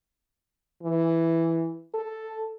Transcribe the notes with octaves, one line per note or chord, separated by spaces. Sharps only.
E3
A4